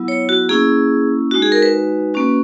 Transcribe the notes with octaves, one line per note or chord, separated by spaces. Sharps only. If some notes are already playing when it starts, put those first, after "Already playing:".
Already playing: F#3 B3 E4
C#5
F#4
A#3 C#4 E4 G#4
G#3 D#4 F#4
G#4
A#4
B4
A#3 C#4 F#4